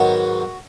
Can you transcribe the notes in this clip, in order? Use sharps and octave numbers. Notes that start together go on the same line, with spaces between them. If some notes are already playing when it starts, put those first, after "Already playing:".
Already playing: G#2 D#3 F#3 B3 F#4